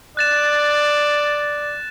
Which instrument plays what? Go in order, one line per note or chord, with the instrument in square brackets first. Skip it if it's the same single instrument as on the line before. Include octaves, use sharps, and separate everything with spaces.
[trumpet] D5 [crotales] F#6 A6 E7